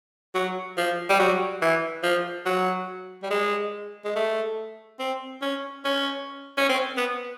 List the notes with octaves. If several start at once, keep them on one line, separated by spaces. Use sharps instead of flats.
F#3
F3
G3
F#3
E3
F3
F#3
G3
G#3
G#3
A3
C4
C#4
C#4
C#4
C4
B3